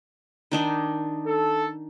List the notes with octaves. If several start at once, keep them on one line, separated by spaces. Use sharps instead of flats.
D#3 D4 D#4
A4